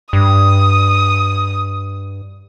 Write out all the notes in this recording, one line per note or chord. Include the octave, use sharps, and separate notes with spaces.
G2 D#6